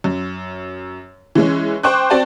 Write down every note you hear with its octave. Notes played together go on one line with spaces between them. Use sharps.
F#2
E3 G#3 C#4
C5 G5 C#6 D6 F#6
C4 F#4 D5 G5 A5